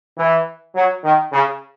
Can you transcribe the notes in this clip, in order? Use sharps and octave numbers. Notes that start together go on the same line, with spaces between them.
E3
F#3
D#3
C#3